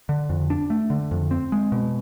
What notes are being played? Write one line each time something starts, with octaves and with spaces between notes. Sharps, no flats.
D3
F2
D4
A3
D3
F2
C4
G#3
B2